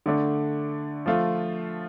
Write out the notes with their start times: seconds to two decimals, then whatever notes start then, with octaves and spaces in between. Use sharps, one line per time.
0.06 D3 A3 D4
1.06 F3 A3 F4